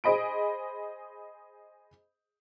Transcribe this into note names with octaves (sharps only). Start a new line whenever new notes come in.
G#4 C5 D#5 B5 D7